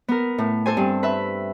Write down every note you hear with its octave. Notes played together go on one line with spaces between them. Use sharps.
B3 A#4
A2
A4 C5 G#5
G2 C4
B4 E5